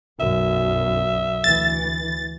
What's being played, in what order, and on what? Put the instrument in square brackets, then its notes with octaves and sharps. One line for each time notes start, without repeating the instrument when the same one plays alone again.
[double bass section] B1 F#2 [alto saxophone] E5
[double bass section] D2 E3 [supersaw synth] A6